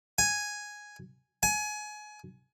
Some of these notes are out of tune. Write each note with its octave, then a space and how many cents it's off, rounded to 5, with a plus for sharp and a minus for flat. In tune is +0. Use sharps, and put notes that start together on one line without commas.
G#5 +0
G#5 +25